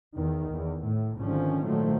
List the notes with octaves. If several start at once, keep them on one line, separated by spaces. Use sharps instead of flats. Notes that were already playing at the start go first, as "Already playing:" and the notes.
E2 D#3
E2
A2
G#1 G#2 D3 D#3 F3 C#4
A#2 D#3 F3 F#3 A3